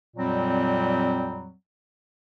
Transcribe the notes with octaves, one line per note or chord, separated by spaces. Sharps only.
F2 A#2 F#3 G3 C4